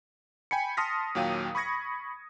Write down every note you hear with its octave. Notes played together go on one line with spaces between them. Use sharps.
G5 G#5 B5 C#7
A5 C6 D#6 F6 A#6 B6
D#2 A#2 F#3 F5 G5 D#7
B5 C#6 D#6 G#6 A#6 C#7